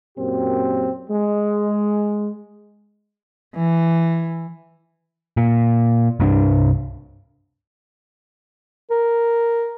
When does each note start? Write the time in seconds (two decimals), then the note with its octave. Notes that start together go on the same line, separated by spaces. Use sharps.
0.17 F#2 A#2 C4 G4
1.10 G#3
3.56 E3
5.37 A#2
6.20 C2 G2 D4
8.90 A#4